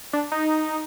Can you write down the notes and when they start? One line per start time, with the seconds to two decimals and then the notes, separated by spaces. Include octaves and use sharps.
0.13 D4
0.32 D#4